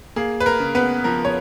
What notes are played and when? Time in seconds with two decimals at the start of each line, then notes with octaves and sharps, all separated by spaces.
0.16 A#3 G#4
0.40 B4
0.46 A#4
0.60 C#3
0.75 B3 B4
1.04 F3 A#4
1.25 C#5